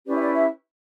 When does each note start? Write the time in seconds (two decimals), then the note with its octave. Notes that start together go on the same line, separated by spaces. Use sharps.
0.05 C#4 E4 G4 B4 D5
0.14 E5
0.18 D5
0.30 E5